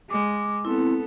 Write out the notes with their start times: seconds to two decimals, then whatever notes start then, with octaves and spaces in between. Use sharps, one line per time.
0.10 G#3 D6
0.65 B3 C4 E4 A4